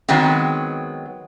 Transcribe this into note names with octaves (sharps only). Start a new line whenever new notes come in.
D#3 F#3 G#3 B3 C4